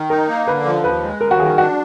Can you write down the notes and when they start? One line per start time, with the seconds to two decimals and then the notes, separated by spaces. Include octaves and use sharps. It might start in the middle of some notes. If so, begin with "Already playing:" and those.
Already playing: D#3
0.10 D#4 A#4
0.28 A#3
0.47 D3 B4
0.66 F3
0.84 D#2 B4
1.02 G#3
1.21 D#2 A#4
1.31 F#4
1.39 D#3 G#4
1.58 D4 F#4